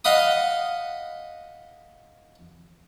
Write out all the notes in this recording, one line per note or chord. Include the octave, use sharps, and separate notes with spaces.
D#5 F5 F#5 B5 D#6